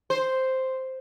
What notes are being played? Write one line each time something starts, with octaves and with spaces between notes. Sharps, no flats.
C5